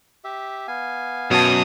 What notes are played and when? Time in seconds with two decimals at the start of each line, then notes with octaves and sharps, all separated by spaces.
0.24 G4 E5
0.68 B3 F5 G#5
1.31 F#2 B2 A5 D#6